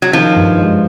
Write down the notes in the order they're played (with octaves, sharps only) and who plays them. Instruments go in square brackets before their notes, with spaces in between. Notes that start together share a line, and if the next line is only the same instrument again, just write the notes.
[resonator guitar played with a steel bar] F#3
[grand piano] D#3 [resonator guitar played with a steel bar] F3
[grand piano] G2
G#3